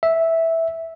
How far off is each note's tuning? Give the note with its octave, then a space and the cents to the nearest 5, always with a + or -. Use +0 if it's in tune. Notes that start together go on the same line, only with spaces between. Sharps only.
E5 -5